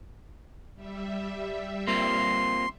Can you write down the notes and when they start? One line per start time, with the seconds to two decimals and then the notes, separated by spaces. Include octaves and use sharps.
0.75 G3 E5
1.87 A#3 C4 F4 C6